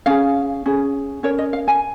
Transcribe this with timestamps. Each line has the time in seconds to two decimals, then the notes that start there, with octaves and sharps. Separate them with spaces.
0.06 C#4 G#4 F5
0.66 C#4 G#4
1.23 C#4 A#4 C#5
1.38 D#5
1.53 F5
1.68 G#5